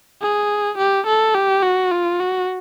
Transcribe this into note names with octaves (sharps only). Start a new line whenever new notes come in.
G#4
G4
A4
G4
F#4
F4
F#4